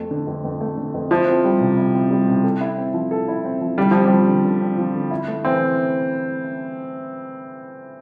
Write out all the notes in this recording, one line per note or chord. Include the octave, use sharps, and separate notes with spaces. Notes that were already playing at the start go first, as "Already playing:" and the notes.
Already playing: F2 A3
D3
F2
F2
A3
D3
F2
F3 E4
C4
G3
C3
E4
C4
G3
C3
A4
E4
C4
F3
A4
E4
C4
F3
D3 G3
F3 C4
G3
F3
D3
D3
C4
F3
D3
E4
A3
E3 C4